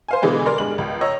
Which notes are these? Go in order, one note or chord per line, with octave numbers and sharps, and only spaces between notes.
C5 F5 G#5
B2 D3 E3 G3 G#3
A#4 D5 C6 F6
G2 G#3 F#7
C#2
C#5 D#5 A#5 E6